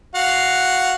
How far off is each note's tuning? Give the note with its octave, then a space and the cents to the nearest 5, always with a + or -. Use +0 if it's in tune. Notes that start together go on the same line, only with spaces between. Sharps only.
F#4 +0 F5 +0